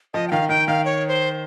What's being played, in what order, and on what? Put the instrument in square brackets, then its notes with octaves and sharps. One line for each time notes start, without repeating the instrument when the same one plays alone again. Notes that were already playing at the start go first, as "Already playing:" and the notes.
[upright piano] F3 [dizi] D#5
[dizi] G5
[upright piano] D#3 [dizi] F5
[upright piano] D#3 [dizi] G5
[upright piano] D#3 [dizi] F5
[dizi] C#5
C5